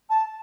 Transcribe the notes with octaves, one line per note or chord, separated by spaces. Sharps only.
A5